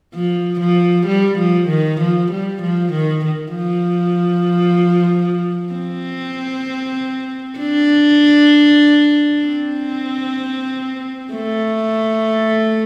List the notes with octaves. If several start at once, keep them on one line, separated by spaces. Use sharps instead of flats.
F3
F3
G3
F3
D#3
F3
G3
F3
D#3
D#3
F3
C4
D4
C4
A3